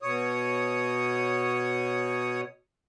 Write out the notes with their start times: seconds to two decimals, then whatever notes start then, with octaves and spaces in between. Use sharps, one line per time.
0.02 B2 C#5 D#6